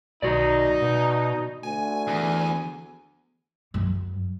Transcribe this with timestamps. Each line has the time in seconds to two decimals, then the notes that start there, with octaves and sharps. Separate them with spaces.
0.22 B1 D#4 F#4 D5
0.82 B2
1.63 D2 G#5
2.07 E2
3.74 F#2